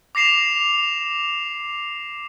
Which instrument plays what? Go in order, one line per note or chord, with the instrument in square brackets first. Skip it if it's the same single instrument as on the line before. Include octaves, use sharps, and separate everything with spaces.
[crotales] D6 A#6 C7 E7 F7